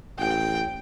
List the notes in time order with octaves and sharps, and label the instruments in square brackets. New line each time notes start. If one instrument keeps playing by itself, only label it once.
[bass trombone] A1 [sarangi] G5